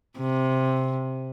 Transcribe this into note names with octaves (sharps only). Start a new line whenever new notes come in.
C3